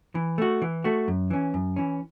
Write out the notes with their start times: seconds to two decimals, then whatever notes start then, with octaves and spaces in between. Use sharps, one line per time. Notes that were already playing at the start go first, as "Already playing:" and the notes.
0.15 E3
0.38 A3 F#4
0.62 E3
0.84 A3 F#4
1.08 F#2
1.30 E3 C#4
1.54 F#2
1.76 E3 C#4